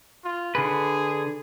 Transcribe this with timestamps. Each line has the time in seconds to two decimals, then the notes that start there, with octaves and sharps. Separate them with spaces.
0.25 F4
0.55 D3 G#4 B4